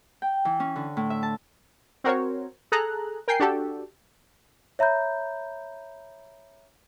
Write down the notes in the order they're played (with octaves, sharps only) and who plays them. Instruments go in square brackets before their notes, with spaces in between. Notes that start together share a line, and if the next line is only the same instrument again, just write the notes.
[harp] G5
E3
C#4
D3
A2
E5
A5
[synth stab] C4 F#4 A#4 C5 C#5
G#4 A4 A#5 F#6
A#4 G5 G#5 C7
D4 F#4 G4 A4
[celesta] C#5 E5 A#5 B5 G6